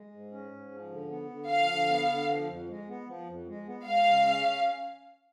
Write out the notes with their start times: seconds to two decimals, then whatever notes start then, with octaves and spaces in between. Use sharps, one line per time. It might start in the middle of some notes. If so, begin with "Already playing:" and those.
Already playing: G#3
0.12 G#2
0.32 C#4
0.51 G#2
0.71 F3
0.91 D3
1.10 B3
1.30 D3
1.49 F3 F5
1.70 D3
1.89 B3
2.09 D3
2.28 F3
2.49 F2
2.69 G#3
2.88 B3
3.08 F3
3.27 F2
3.47 G#3
3.67 B3
3.87 G#3 F5
4.07 C#3
4.26 C#4